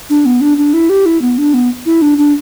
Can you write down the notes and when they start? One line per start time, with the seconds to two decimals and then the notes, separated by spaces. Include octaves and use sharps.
0.10 D4
0.26 B3
0.41 D4
0.58 D4
0.74 E4
0.90 G4
1.06 E4
1.22 B3
1.38 D4
1.54 B3
1.86 E4
2.02 D4
2.18 D4